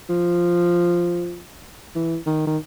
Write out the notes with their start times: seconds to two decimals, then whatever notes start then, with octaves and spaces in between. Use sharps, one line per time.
0.09 F3
1.95 E3
2.26 D#3
2.47 D#3